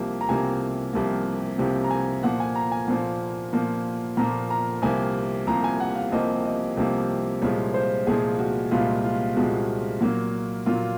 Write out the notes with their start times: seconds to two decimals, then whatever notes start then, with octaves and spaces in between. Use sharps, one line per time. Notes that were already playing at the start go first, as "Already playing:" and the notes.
Already playing: C2 C3 F3 A#3
0.21 A#5
0.29 C2 C3 F3 A#3 G#5
0.93 C2 C3 F3 A#3
1.58 C2 C3 F3 A#3
1.84 A#5
1.91 G#5
2.23 A#2 F3 A#3 F#5
2.40 G#5
2.56 A#5
2.72 G#5
2.88 A#2 F3 A#3
3.53 A#2 F3 A#3
4.17 A#2 F3 A#3 A#5
4.50 A#5
4.82 C2 C3 F3 A#3 G#5
5.47 C2 C3 F3 A#3 A#5
5.64 G#5
5.80 F#5
5.95 F5
6.11 C2 C3 F3 A#3 D#5
6.45 D#5
6.77 C2 C3 F3 A#3
7.42 C2 A#2 F3 G#3 C#5
7.74 C5
8.07 C2 A#2 F3 G#3 G#4
8.39 F#4
8.71 C2 A#2 F3 G#3 F4
9.04 F4
9.36 C2 A#2 F3 G#3 F#4
10.01 A#2 F#3 A#3
10.66 A#2 F#3 A#3 F4